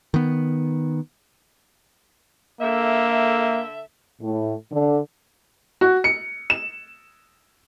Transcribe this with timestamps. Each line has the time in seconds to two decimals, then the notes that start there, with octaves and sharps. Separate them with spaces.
0.14 D#3 B3
2.61 D3 A#3 A4 E5
4.21 A2
4.72 D3
5.81 F#4
6.04 C#7
6.50 E7